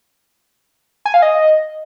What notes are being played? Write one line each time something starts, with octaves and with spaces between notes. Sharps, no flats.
G#5
F5
D#5